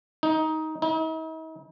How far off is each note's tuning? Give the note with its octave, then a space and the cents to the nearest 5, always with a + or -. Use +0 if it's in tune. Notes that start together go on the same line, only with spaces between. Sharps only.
D#4 +15
D#4 +45